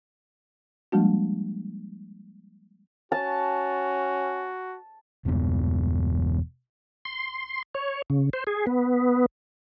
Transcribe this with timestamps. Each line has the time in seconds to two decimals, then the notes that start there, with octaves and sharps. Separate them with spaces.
0.92 F3 G3 G#3 A#3 D4 F#4
3.12 C#4 F#4 A5
5.25 E1 E2 G2 B2
7.05 C6
7.75 C#5
8.10 C#3
8.33 C5
8.47 G#4
8.67 B3